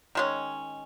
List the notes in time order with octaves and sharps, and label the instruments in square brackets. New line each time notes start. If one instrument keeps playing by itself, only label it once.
[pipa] D#3 G#3 C#4